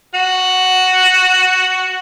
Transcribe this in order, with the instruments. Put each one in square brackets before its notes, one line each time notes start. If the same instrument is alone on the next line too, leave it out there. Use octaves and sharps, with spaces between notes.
[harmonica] F#4 F#5